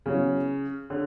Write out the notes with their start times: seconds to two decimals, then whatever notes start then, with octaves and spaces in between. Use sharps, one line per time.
0.06 C#3 F#3 B3 E4 G#4 C#5
0.90 D3 G#4 C#5